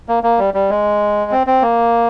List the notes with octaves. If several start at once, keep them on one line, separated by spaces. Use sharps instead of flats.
A#3
A#3
G3
G3
G#3
C4
C4
A#3